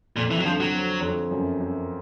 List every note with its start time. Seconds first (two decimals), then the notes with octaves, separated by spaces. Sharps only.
0.16 F2 A#2
0.31 E3
0.40 F#3
0.45 D3 F3
0.60 F#3
0.74 C4
1.02 F2
1.31 F#2
1.59 F#2